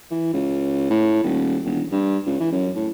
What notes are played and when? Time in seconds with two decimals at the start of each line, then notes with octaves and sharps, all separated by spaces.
0.11 E3
0.33 C#2
0.90 A2
1.23 D#1
1.65 E1
1.91 G2
2.26 C#2
2.40 E3
2.52 F#2
2.75 A2